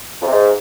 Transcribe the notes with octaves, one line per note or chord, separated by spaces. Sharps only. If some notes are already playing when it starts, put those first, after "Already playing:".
F2
C3
G#2